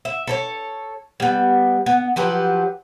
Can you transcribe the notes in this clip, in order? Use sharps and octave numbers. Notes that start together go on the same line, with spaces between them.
E5
A4 C5 C#5
G3 B3
B3
F3 F#3 G4 B4